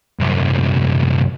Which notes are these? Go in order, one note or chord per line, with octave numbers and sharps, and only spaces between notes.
C2 F#2